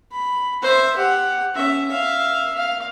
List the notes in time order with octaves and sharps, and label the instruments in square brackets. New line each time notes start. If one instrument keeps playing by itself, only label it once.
[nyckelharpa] B5
C5 E5
G4 F#5
C#4 E5
E5 F5
F5